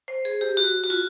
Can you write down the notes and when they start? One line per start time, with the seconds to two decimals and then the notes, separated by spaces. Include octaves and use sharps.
0.08 C5
0.25 G#4
0.41 G4
0.57 F#4
0.84 F#4
0.90 F4